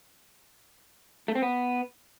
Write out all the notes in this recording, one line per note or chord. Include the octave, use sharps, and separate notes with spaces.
A3
C4
B3